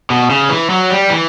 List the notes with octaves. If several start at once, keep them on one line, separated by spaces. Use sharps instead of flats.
B2
C#3
E3
F#3
G3
E3